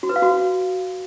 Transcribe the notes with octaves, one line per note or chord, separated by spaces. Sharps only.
F#4
B4
F5
F#4